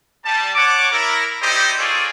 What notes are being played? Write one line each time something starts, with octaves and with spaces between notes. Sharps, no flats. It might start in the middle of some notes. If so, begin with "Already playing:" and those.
G3 A5
C#5 F#5 A5 D6
E4 A#4
D#4 E4 G4 C5 D5 D#5
F4 G#4 A4 C#5 D5